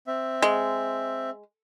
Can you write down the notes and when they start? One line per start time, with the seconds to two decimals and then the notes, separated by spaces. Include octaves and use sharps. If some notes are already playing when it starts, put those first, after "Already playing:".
0.07 C4 E5
0.42 G#3